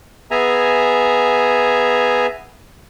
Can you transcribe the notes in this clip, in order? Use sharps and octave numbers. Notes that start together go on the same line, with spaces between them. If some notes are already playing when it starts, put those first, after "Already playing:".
B3 G#4 E5 G#5 A#5